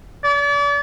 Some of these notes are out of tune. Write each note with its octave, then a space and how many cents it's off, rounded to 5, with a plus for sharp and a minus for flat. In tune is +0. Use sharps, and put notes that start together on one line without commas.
D5 -40